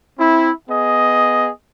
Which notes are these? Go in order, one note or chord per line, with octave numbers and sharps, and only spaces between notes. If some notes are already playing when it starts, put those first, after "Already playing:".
C4 E4
B3 G#4 D#5